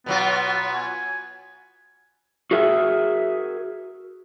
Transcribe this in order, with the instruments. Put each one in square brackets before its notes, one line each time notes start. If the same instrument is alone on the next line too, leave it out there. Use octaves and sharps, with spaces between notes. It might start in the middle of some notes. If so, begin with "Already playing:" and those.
[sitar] B2 F#3 F4 [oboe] B3
[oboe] G#5
[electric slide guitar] F#4 G#4 A#4 E5